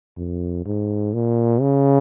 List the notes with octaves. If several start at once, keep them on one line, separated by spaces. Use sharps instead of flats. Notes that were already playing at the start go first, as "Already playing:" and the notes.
F2
G#2
A#2
C#3